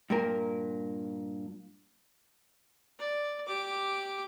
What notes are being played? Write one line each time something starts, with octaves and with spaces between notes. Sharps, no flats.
G2 A#2 A#4
D5
G4 D6